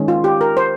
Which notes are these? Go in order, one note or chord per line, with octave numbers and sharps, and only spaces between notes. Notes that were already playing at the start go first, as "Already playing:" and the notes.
Already playing: D#3 G#3 C#4
F4
G4
A#4
C5